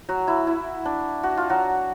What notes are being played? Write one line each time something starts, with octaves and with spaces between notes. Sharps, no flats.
F#3 F#4
E4
E4
D4
F#4
F4
F#3 F#4